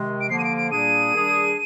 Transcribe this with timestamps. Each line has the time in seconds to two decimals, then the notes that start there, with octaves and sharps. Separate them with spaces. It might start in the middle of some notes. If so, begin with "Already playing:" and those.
Already playing: C3 D#3 G#3
0.21 D7
0.29 D3 F3 A#3 C7
0.39 D#7
0.44 D7
0.57 D7
0.71 A#2 G3 A#3 D4 G#4 D#7
1.13 D#3 G3 D4 G#4